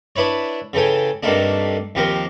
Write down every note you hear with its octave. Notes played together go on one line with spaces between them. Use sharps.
D4 E4 B4 C#5
C#3 E3 A4 G5 G#5
G2 C3 D#3 A3 A#3 D4
D#2 C3 F3 G4 A#4